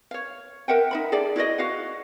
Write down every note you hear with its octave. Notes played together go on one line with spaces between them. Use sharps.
C#5 F5
A#4 E5 F#5 G5
D#4 E5 B5
G#4 A4 D5
E4 F#4 D5 D#5
F#4 F5 F#5